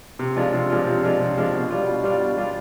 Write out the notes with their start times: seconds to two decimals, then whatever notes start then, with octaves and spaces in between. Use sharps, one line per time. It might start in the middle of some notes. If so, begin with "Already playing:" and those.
0.19 C3
0.36 F3 G#3 D4 F4
0.54 C3
0.70 F3 G#3 D4 F4
0.86 C3
1.03 F3 G#3 D4 F4
1.20 C3
1.37 F3 G#3 D4 F4
1.54 B2
1.71 G3 D4 F4
1.87 B2
2.03 G3 D4 F4
2.20 B2
2.37 G3 D4 F4